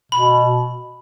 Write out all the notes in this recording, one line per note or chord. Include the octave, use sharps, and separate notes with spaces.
B2 B5